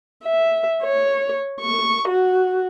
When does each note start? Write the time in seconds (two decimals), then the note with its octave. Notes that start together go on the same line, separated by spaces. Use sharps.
0.24 E5
0.84 C#5
1.61 C#6
2.08 F#4